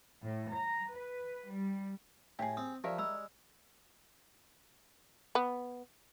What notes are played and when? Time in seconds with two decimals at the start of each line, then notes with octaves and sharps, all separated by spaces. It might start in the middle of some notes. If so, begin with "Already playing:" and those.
0.23 A2
0.53 A#5
0.94 B4
1.53 G3
2.39 A2 G4 G#4
2.57 C4 D#6
2.84 F3 G4 A#4 D5 E5
2.98 G#3 B5 E6
5.35 B3